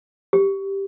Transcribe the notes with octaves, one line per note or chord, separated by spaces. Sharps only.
G4